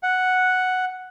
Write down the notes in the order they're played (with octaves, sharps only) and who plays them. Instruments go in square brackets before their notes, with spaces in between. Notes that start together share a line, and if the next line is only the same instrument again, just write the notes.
[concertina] F#5